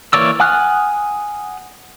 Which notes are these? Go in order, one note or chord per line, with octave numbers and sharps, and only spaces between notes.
E3 A#3 C#5 D5 E6
F#5 G#5 D#6 F6 F#6